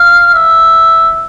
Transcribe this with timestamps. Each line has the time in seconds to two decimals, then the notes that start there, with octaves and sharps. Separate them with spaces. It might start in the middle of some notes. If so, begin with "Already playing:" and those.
Already playing: F5
0.34 E5